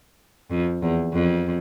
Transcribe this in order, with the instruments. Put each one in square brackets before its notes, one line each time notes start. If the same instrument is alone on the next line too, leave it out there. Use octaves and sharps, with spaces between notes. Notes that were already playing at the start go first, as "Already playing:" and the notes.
[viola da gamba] F2
E2
F2